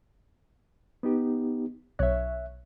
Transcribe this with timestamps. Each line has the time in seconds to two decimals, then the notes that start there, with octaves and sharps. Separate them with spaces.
1.03 B3 D#4 G4
1.99 B1 C#5 E5 F#6